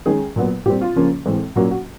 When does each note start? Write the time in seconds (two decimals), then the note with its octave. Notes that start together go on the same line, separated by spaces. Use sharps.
0.06 D#3 G#3 C#4 G#4
0.36 A#2 F#3 B3
0.65 A#2 G3 C4 G4
0.81 F4
0.96 C#3 F3 A#3 C#4
1.26 A2 E3 G#3 C4
1.56 A#2 F#3 A#3 C#4 F#4
1.71 F#4